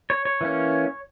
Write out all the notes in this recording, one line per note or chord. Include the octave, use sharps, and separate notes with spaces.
C#5
C#5
E3 A#3 C#4